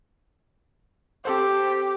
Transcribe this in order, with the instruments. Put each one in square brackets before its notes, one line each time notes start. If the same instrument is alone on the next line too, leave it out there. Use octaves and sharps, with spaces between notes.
[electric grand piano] C4 A4 C5 [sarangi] G4